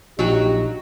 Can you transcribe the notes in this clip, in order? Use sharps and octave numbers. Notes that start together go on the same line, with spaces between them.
A#1 F#3 D#4 F#4 G4 G5